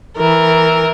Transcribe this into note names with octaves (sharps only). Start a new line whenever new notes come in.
E3 A#4